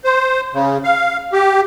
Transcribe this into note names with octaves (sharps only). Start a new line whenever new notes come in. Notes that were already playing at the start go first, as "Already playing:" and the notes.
C5
C#3
F5
G4